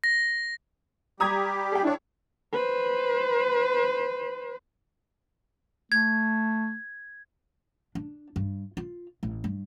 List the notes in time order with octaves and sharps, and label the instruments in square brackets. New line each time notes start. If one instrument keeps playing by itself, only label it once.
[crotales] A#6
[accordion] G3 G4 [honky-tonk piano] A#5 D#6 G#6
[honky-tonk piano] G#4 G5
[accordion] D4 [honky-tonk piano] E4 C#5
[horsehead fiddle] B4 C5
[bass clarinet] A3 [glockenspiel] G#6
[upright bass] D4
G2
F4
A1
G2